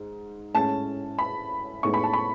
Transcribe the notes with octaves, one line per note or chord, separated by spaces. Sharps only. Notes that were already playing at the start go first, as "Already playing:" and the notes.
Already playing: G#2
A2 G#3 C#4 A5
B5
A2 G#3 B3 D#4 C#6
B5
A5
B5